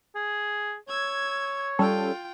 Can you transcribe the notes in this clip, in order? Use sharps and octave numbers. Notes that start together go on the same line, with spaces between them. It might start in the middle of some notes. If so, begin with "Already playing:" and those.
G#4
C#5 E6 G#6
G3 C#4 F4 A4 G5